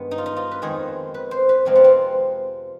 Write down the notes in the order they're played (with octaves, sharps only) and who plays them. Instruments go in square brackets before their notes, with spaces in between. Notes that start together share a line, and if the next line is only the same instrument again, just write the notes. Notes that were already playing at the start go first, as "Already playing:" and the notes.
Already playing: [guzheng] G2 D#3 G#3 B3
D#4
F4
D#4
F4
B4
F2 D#3 G#3 G#4
B4
C5
B4
F2 C3 F3 G#3 C4
B3
C4